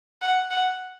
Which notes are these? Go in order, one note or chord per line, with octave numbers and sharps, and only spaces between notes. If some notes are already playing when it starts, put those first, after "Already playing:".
F#5
F#5